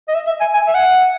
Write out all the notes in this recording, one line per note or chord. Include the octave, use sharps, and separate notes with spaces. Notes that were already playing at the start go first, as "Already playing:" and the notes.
D#5
E5
E5
G#5
G#5
E5
F#5